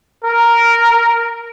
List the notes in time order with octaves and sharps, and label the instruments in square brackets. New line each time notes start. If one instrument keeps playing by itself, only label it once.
[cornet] A#4